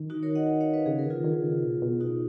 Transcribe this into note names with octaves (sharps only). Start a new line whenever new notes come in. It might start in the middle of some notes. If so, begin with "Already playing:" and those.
Already playing: D#3
D#4 F#4
A#4 C#5
D#5 F#5
C#5 F5
B4 D#5
C#3 G#4
A#4
D#3 F4 G#4
D#3
C#3
B2
B2
D#4 F#4